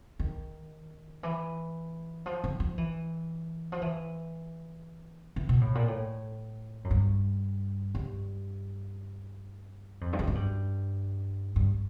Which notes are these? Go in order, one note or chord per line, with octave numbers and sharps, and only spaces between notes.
D#3
E3
F3
F3
F3
E3
F3
E3
E3
B2
A2
A#2
A2
F#2
G2
G2
F2
G2
F#2
G#2
G2
G2